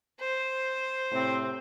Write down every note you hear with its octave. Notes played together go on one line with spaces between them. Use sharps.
C5
A2 C3 C4